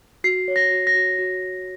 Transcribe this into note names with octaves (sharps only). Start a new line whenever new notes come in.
F#4 C7
C#5
A#6
F#4
A#6
F#4
F#4